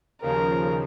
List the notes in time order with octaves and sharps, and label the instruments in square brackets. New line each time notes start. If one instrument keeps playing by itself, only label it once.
[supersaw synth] D#2 C#3 F3 [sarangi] A#4